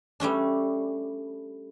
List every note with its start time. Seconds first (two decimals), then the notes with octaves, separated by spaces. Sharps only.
0.20 G3 A3 C#4 D4